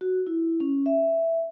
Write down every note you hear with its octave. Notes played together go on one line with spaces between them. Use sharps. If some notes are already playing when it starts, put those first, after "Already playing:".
F#4
E4
C#4
E5